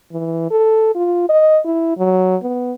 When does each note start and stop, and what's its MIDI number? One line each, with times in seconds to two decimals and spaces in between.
0.12 0.50 52
0.51 0.95 69
0.95 1.25 65
1.29 1.59 75
1.65 1.95 64
1.97 2.36 54
2.43 2.73 59